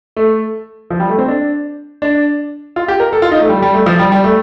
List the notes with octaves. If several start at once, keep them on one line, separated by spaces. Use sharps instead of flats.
A3
F3
G3
A3
C4
D4
D4
F4
G4
A#4
A4
F4
D#4
A3
G3
G3
A3
F3
G3
G3
A3